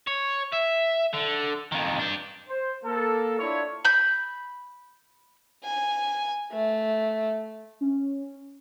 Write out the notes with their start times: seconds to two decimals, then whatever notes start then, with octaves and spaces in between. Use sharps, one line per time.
0.07 C#5
0.53 E5
1.14 D3
1.72 F2 D#3
1.99 D4 G4
2.49 C5
2.84 A#3 A4
3.39 D4 E4 F4 C#5
3.85 B5 G6
5.64 G#5
6.52 A3
7.81 C#4